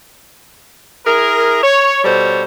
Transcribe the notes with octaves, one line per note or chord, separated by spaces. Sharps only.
E4 G#4 A#4
C#5
B2 G3 A4 C5 C#5